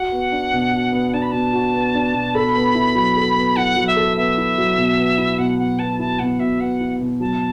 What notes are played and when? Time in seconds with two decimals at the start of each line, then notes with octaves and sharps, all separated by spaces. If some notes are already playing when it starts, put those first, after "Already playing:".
Already playing: F#4 F#5
0.12 B3
0.32 D4
0.53 B2
0.73 F#4
0.93 B3
1.14 D4 A5
1.22 B5
1.32 B2 A5
1.53 F#4
1.74 B3
1.95 D4
2.14 B2
2.35 A4 B5
2.56 B3
2.75 E4
2.95 F#3
3.16 A4
3.36 B3
3.56 E4 F#5
3.76 F#3
3.87 E5
3.96 A4
4.17 B3 E5
4.38 E4
4.58 F#3
4.78 B2
4.98 B3
5.18 E4
5.38 B2 F#5
5.59 B2 F#5
5.79 B3 A5
5.99 E4 A5
6.19 B2 F#5
6.40 B2 E5
6.60 B3 F#5
6.81 E4
7.01 B2
7.20 F#3 A5